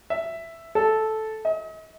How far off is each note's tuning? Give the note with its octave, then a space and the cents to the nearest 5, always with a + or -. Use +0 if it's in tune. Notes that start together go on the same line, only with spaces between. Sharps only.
E5 +0
A4 -10
D#5 +40